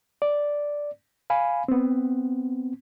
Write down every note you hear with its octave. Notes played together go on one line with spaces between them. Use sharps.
D5
F5 G#5 B5
B3 C4